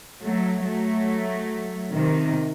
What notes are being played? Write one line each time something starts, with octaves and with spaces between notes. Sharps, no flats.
F#3 A3
F#3 A3
C3 D#3